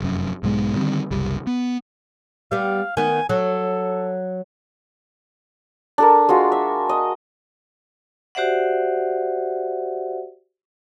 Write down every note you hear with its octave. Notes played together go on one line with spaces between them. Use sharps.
F1 F#2
B1 G#2 B2 G#3
D3 D#3 G3 C4
F#1 C2 G3
B3
G3 B3 F5
D#3 B3 G#5
F#3 A4
D4 A4 A#4
G#3 F4 F#4
E5
D#5
F#4 G4 C5 D5 E5 F#5